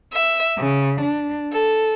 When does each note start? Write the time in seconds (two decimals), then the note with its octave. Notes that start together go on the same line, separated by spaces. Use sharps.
0.12 E5
0.57 C#3
1.01 D4
1.54 A4